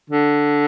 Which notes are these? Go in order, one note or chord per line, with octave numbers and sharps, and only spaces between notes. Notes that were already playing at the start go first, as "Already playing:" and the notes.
D3